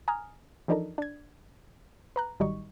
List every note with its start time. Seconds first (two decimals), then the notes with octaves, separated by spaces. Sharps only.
0.08 G#5 A#5 D#6 F6
0.68 E3 F3 D4 D#4 A4 A#4
0.98 D4 G#6
2.16 B4 A#5 F#6
2.40 A1 D#3 F#3 G3 D#4 C#6